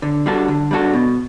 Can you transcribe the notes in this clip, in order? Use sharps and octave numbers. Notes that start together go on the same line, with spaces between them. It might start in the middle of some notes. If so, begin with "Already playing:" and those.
D3
G3 D4 F#4 A4
D3
G3 D4 F#4 A4
B2